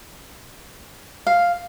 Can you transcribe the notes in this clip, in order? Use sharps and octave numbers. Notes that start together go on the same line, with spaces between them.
F5